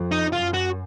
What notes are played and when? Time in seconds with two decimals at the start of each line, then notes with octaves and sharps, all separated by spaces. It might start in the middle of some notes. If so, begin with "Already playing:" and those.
Already playing: F2
0.12 D#4
0.33 F#2 F4
0.54 F#4